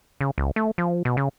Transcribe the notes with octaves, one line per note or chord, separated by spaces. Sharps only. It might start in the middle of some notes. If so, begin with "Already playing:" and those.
C#3
C#2
A3
F3
B2
C#3